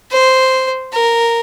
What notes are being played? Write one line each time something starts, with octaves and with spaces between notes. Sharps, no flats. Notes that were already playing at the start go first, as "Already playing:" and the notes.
C5
A#4